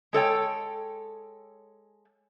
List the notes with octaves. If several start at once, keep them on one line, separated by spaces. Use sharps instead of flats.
G#3 A4 C#5 G5